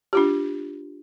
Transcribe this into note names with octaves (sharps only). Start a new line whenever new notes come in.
D4 F4 G4